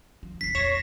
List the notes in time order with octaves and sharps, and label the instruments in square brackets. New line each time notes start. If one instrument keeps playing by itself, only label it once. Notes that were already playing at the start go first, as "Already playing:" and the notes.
[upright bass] F3
[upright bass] D#1 C2 [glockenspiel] B6 C7
[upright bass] E2 [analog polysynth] C#5 A#6 [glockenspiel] E7